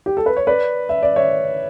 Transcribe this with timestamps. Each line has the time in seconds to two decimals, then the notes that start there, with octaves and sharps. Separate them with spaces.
0.06 G4
0.17 A4
0.26 B4
0.37 C#5
0.47 B4 D5
0.89 E5
1.03 D5
1.16 C#5 E5